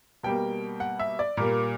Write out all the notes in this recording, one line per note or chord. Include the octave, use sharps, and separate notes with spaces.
B2 G3 A#3 G5
F#5
E5
D5
A#2 G3 A#3 A#4